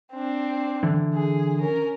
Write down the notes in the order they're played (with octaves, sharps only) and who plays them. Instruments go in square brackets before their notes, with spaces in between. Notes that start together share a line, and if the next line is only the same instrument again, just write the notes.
[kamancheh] C4 D4
[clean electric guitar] D3 E3
[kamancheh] G#4
C#4 A#4